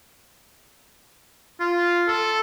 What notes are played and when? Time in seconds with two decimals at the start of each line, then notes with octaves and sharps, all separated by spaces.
1.60 F4
2.08 A4